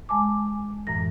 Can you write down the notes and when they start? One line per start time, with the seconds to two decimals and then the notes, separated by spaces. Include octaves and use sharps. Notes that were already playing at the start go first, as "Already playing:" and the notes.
0.09 G#3 G#5 A5 D6
0.87 F#2 A2 E3 A#6